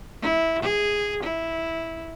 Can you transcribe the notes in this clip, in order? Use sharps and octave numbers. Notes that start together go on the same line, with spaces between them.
E4
G#4
E4